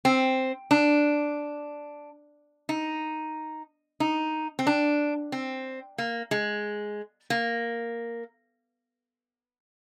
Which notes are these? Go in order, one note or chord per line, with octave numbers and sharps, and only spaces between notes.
C4
D4
D#4
D#4
C4
D4
C4
A#3
G#3
A#3